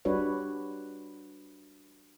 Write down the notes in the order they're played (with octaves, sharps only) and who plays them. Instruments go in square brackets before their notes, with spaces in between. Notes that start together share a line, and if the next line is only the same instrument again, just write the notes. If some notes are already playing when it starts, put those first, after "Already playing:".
[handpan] G3 D4 F#4 B4 C#5